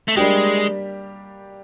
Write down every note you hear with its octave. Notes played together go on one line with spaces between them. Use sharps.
A3
G3 G#3 A#3 D4 G4